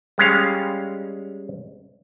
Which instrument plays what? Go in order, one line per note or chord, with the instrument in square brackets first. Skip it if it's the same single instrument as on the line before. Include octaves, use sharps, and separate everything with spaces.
[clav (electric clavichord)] G3 G#3 C#4 F5